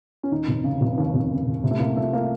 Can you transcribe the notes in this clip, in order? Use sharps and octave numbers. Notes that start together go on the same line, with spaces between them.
C#4
D#2 D#4
F1
C#3
F1
D#2
F1
C#3
F1
C3
A3
C2 A#3
F3 A3
A#3